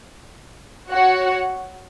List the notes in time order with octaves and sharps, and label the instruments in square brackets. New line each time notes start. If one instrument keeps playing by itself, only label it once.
[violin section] F#4 C#5 F#5